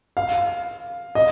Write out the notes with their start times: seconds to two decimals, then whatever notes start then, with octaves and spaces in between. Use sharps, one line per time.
0.17 F5
1.15 D#5